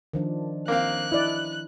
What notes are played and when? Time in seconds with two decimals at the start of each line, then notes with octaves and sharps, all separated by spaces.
0.13 D#3 F3 D4
0.68 A#3 C4 F5 F#6
1.12 D#4 E4 D5